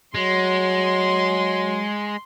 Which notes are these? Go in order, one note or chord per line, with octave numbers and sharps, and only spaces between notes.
F#3 G#3 C6